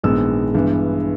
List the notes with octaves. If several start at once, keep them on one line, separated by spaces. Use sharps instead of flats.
A#1 G#2 D#3 G#3 B3 E6
G2 E3 G#3 B3